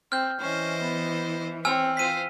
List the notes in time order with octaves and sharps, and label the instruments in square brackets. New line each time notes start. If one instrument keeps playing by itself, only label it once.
[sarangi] C4 [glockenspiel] F6 G6
[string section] E3 [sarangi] C#4 [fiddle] C5 D#5
[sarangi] B3
[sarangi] C4 [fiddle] C#5 [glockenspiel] G#5 E6 F6
[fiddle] F4 C5 [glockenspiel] B6 D#7